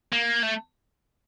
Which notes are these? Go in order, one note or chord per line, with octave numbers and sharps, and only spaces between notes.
A#3
A3